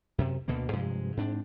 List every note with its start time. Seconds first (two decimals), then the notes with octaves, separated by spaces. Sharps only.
0.18 F#2 C3
0.48 D2 B2 D3 A#3
0.73 G2 C3 F3 G#3
1.17 G#2 C4 D4